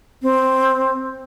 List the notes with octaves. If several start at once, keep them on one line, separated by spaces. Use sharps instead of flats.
C4